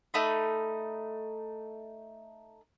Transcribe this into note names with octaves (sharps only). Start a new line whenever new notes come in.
A3 D#4 B5